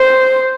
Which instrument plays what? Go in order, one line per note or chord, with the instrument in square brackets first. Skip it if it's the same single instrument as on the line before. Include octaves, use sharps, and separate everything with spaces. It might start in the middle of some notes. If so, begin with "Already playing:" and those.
Already playing: [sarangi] C5